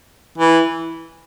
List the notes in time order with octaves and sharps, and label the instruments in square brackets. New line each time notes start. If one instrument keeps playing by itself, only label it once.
[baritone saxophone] E3